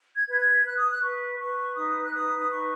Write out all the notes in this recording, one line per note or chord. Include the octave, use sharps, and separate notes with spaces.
G#6
B4 G#6
G#6
B4 F#6
D#6
F#6
B4 C#6
B4 C#6
D#4 D#6
F#6
B4 D#6
D#6
D#4 C#6